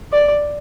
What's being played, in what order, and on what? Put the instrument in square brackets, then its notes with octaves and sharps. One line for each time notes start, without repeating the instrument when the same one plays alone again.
[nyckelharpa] D5